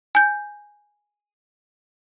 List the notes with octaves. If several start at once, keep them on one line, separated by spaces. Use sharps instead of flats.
G#5 G6